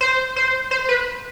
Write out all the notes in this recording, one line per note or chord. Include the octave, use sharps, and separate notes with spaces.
C5
C5
C5
B4